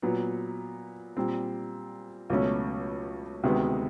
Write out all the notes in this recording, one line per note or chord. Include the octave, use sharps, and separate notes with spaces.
A#2 F#3 B3
A#2 G3 C4
C#2 B2 F#3 A3 C#4
D2 C3 D#3 G#3 B3